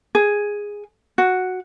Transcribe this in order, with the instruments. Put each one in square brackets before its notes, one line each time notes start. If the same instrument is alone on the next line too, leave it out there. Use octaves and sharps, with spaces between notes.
[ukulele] G#4
F#4